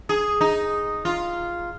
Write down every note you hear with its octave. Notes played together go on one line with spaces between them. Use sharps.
G#4
D#4
F4